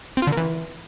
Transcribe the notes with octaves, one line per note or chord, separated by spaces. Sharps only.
C4
F4
D3
A#3
E3